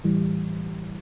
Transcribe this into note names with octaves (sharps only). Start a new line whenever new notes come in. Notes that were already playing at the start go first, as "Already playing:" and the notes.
A2 E3 G3